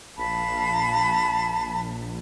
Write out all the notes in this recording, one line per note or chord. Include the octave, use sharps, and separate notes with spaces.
A#1 F5 A5 B5